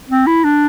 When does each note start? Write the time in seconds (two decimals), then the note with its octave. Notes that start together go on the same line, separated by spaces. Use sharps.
0.10 C4
0.27 E4
0.44 D4